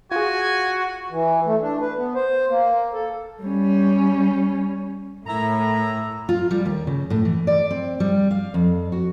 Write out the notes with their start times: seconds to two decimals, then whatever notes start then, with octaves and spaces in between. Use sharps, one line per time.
0.12 F4 F#4 G#4 G#5
1.10 E3
1.46 A3
1.61 D4
1.81 B4
1.97 B3
2.15 C5
2.50 A#3
2.93 A4
3.43 G3 C#4
5.27 A2 E4 A#4 A#5
6.29 F4
6.51 G3
6.66 D#2
6.87 C#3
7.10 A2
7.25 E3
7.47 D5
7.71 C4
8.00 G3
8.31 F5
8.54 F2
8.92 F#4